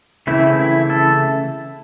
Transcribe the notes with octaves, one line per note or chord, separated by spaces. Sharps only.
C#3 E3 A3 C4 E4
E4
A4